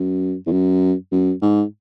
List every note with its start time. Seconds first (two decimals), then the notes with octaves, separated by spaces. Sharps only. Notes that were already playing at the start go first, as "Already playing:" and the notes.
Already playing: F#2
0.47 E2
0.51 F#2
1.12 F#2
1.42 G#2